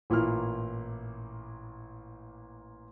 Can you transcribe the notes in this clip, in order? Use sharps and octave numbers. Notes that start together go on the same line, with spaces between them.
A1 A#2 A#3 E4 F6